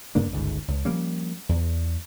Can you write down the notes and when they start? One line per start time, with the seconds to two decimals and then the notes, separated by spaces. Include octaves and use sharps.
0.15 G2 C#3 A#3 D4
0.32 G1 C#2 G#2
0.68 C#2
0.85 F3 G3 A#3 C#4
1.49 E2